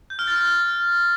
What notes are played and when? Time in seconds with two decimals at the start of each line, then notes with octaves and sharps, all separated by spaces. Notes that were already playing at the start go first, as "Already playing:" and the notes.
0.10 G6
0.19 F6
0.27 A6
0.36 F6